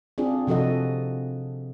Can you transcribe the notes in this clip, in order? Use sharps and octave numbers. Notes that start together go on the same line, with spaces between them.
C4 D4 F4 G#4
C3 F3 F#4 A4 D#5